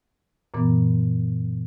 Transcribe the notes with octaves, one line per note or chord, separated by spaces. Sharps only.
F#2 A#2 E3 B3